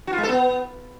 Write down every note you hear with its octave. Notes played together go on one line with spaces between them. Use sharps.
F#4
F4
G#3
A4
B3